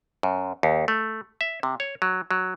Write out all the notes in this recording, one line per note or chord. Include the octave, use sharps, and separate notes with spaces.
F#2
D#2
A3
E5
C3
C#5
F#3
F#3